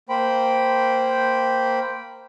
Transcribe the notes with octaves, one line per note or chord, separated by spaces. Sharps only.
A#3 C5 G5 B5